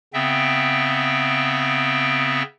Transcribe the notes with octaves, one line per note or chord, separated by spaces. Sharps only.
C#3 B3 C4 E5 G5